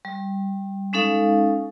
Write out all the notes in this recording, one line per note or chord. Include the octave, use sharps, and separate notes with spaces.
G3
G#3 C#4 D#4 A4 F5